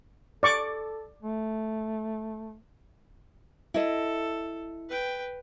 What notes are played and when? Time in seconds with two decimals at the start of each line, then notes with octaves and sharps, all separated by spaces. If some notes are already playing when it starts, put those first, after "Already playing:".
0.43 A4 D5 C#6 D6
1.23 A3
3.74 E4 A4 D#5
4.89 B4 G5